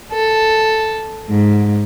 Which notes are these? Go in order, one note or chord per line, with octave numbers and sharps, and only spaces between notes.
A4
G#2